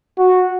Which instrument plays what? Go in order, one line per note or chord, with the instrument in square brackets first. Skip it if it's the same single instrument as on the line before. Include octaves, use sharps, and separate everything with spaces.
[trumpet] F#4